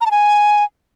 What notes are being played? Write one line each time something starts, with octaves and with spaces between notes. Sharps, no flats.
A#5
A5
G#5